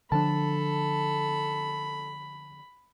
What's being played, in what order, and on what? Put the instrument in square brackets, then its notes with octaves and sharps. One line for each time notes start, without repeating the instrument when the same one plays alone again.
[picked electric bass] D3 F3 D4 [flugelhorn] A4 [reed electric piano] A5 [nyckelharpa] B5